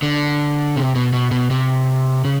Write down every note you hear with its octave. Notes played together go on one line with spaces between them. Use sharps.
D3
C3
B2
B2
B2
C3
C#3